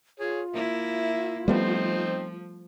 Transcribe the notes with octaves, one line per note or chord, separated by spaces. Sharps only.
F4 G#4 C#5
A#3 E4 E5
F3 G3 A3 B3 C4 D#4 C6